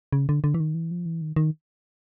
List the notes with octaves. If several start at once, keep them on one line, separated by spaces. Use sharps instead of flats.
C#3
D3
D3
E3
D#3
E3
F3
E3
D#3
D#3